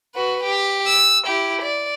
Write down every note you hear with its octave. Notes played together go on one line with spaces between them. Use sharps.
F#4 B4
G4
E6
E4 G4
D5